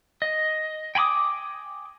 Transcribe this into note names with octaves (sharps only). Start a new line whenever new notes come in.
D#5
G5 G#5 B5 D6 D#6